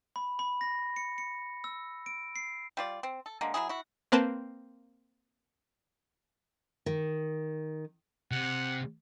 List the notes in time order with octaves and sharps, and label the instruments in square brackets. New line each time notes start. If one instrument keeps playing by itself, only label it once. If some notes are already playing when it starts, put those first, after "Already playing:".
[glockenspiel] B5
B5
A#6
C#7
C#7
E6
D7
C7
[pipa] G3 F4 D5
C4
A4
D3 G#3 A#3
F#3 G3 E4 G#4
E4 F#4
[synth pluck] A#3 C4 B4 C5 A5
[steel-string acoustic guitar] D#3
[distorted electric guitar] C3 [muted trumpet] F#5